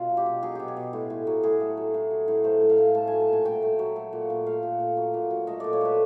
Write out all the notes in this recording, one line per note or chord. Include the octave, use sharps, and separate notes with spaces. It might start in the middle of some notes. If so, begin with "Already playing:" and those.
Already playing: B2 A3 F4
F#3
G4
B2
F#3 G#4
B2 G4
G#4
B2
A2
A2
F#3
A2 G#4
A3
F#3
A2
F#3
A2
A3 C5
A2
F5
A2
A3 A5
F#3 G#5
A5
A#2 G#5
A3 G5
A3
F#3
A3
A#2
A#2
A3 F5
A#2
A#2
F#3
A#2
F#3
A3 D#5
A#2 D5
C#5
A3 B4